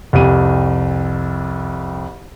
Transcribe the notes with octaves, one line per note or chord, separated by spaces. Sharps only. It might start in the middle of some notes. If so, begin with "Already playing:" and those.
C2 F2 D#7